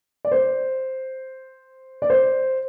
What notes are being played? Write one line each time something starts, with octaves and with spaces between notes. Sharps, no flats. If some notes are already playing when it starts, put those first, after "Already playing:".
D5
C5
D5
C5